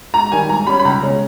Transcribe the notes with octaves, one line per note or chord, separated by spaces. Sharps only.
G#2 A#5
D#3 G3 G#5
G#2 A#5
G3 C#4 B5
B5
C#2 A#5
C#3 G#3 C#4